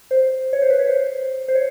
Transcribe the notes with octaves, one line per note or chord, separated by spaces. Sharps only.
C5
C#5
C5
B4
C#5
C5
C5
C#5